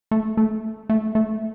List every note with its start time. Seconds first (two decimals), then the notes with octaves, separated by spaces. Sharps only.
0.11 A3
0.37 A3
0.89 A3
1.15 A3